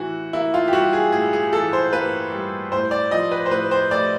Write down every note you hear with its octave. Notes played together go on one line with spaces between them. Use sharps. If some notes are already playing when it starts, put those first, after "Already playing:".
Already playing: A2 E3 F#4
A#3 E4
F4
G4
G3 F#4
G#4
A2 G#4
G#4
E3 A4
C5
A#3 B4
G3
A2 C5
D5
F3 D#5
B4
C5
A2 B4
C5
A3 D5